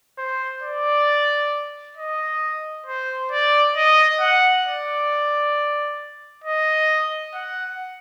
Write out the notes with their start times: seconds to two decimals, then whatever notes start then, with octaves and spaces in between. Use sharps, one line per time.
0.18 C5
0.62 D5
1.97 D#5
2.86 C5
3.32 D5
3.77 D#5
4.20 F#5
4.65 D5
6.44 D#5
7.34 F#5